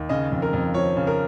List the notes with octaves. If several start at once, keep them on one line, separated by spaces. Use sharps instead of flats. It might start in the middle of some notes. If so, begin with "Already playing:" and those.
Already playing: D#2
C#3 D#5
F2
A#4
F2
F3 C#5
C#3
A#4